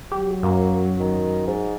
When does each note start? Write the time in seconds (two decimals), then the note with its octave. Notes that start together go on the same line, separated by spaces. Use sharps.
0.12 F#3 G4
0.43 F#2 A#3
0.99 D#3
1.47 G#2